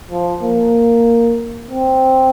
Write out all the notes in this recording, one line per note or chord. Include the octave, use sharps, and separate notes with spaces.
F3
A#3
C4